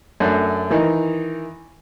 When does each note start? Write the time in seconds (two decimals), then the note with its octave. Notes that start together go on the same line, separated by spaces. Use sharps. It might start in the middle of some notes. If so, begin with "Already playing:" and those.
0.20 F#2 A3 D4
0.70 D#3 E3 D#4